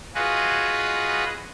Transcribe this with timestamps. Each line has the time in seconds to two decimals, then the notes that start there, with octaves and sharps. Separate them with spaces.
0.15 F4 F#4 G#4 B4 D#5